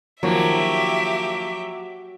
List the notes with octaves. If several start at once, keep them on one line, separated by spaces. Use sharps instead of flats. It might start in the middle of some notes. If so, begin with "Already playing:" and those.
D#3 F3 F#3 A#3 G4 E5